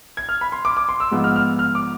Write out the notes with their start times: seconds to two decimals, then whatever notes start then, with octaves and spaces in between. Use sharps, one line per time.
0.17 G#6
0.29 F6
0.41 B5
0.52 C6
0.65 D6
0.77 D6
0.89 C6
1.00 E6
1.11 G#2 F3 G#3 B3 F4
1.24 F6
1.36 F6
1.59 F6
1.75 D6